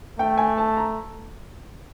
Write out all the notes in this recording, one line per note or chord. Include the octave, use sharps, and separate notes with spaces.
A3 G5
G#5
A5
A#5